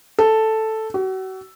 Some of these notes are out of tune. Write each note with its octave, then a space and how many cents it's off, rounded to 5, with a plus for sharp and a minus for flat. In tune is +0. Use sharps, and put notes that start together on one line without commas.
A4 +0
F#4 +35